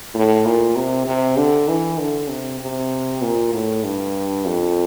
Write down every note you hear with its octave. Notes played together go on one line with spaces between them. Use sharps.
A2
A#2
C3
C3
D3
E3
D3
C3
C3
A#2
A2
G2
F2